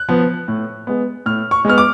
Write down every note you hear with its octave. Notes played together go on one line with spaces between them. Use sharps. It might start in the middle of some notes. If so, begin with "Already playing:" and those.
Already playing: F#6
F3 B3
A2
G#3 B3
A2 F6
C#6
G#3 B3 F6
D6